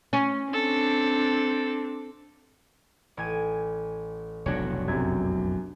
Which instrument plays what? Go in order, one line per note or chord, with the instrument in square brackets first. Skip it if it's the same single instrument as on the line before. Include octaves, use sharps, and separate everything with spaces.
[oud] C#4
[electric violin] C4 D4 [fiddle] A4
[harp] A1 G#5 D#7
[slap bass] F1 B1 A2 [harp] D4 F#4 C#5
[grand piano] F#2 C3 [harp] G#6